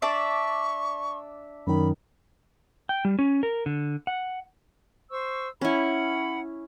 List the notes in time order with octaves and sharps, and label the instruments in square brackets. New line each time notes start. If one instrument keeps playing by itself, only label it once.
[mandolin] D4 D5 E5 [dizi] C#6
[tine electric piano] F#2 D#3 [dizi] B5
[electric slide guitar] G5
G3
C#4
A#4
D3
F#5
[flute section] C5 C#6 E6
[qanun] C#4 E4 [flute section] F#5 B5